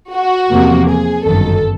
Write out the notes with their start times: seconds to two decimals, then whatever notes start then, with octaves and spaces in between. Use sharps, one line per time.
0.14 F#4
0.51 E2 C3 F3 A#3
0.88 G#4
1.26 G1 F#2 D#3 A4